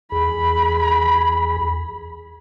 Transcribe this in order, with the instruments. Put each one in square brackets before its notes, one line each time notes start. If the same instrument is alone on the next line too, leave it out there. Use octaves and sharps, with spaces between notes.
[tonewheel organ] E2 G#4 [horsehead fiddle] B5